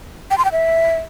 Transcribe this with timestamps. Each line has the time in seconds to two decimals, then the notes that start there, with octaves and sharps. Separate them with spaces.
0.31 G5
0.38 C6
0.45 G5
0.52 E5